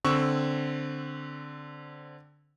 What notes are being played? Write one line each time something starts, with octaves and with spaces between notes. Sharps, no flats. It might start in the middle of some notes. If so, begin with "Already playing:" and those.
D3 C4 C#6 E6